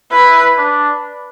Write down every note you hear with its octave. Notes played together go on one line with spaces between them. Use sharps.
E4 B4
D4